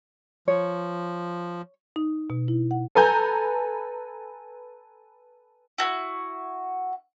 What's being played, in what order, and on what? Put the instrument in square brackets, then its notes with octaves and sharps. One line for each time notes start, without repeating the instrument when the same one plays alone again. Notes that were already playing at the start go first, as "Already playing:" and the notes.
[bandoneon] F3 [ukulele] C#5
[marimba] D#4
B2
E4
F#5
[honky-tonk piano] A4 B4 G#5 A#5 G6
[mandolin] E4 F#4